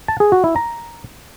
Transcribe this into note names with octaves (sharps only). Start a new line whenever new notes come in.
A5
G#4
F#4
E4
A#5